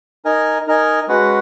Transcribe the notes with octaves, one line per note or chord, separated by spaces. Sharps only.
D#4 A#4 D#5 G#5
D#4 A#4 D#5 G#5
G#3 C#4 F#4 B4 F#5